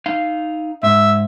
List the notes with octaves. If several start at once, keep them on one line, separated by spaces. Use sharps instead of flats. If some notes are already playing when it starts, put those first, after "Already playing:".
D#4 F5
G#2 E5